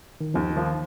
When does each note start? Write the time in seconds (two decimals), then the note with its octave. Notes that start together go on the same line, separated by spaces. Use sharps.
0.21 D#3
0.34 D#2 F3
0.57 D#3 F3